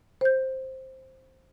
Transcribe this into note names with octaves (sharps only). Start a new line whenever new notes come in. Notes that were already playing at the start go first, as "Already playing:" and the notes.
C5 G6